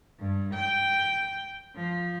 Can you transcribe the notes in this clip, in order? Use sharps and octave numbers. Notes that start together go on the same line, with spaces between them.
G2
G5
F3